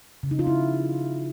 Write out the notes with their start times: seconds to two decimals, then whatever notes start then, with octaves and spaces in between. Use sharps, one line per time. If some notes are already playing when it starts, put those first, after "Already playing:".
0.23 C#3
0.31 D#4
0.39 F4
0.47 E4